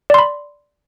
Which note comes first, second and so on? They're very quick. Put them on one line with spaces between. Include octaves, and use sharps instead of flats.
D5 C6 B5